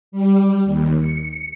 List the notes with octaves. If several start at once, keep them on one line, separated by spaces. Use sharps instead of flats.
G3
D#2
C#7